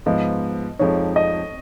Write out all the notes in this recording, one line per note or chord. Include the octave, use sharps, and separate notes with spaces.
G#2 F3 B3 D#5
F2 F3 G#3 D#4 C#5
D#5